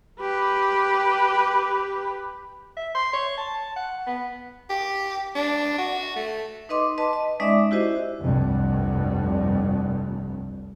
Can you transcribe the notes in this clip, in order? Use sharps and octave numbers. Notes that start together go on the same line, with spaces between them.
G4 B4
E5
C6
C#5
A5
F#5
B3
G4
D4
F#4
A3
D#4 B4 D#5 C6 D6
B4 D#5 A5 C6
D#5
G#3 C#4 D#4 D5 E5 D6
E4 F#4 G4 C5 D#5
F1 C2 G2